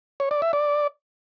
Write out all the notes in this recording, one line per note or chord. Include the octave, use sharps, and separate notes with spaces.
C#5
D5
E5
D5